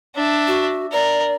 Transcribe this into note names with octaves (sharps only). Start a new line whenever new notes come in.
D4 E5
F#4
A#4 D5